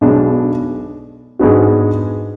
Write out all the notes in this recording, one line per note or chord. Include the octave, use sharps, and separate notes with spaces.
B1 B2 G#3 D4
G#2 G#3 B3 D4 F#4